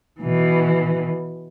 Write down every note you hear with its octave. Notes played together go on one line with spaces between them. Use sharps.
B2 E3